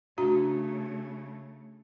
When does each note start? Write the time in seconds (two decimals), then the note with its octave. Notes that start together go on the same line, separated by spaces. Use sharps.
0.18 C#3 A3 D4 F#4 A#5